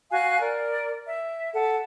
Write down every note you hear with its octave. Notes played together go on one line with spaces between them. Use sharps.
F#4 F5 G#5 F#6
A#4 D5
E5
A4 F#5